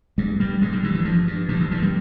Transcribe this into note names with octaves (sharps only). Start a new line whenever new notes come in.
G2 G#3
G2 G3
G2 G#3
G3
G2 E3
E3
G2 F3
G2
G2 F3
E3
G2 F3
G3